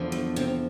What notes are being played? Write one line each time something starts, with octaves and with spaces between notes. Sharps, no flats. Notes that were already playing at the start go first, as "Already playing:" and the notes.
Already playing: E2 D3 F3
A3
C3 C4